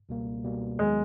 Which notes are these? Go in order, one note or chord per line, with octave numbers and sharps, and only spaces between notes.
C#2 B2 G3 A#3
C#2 B2 G3 A#3
D#2 D#3 F#3 G#3 B3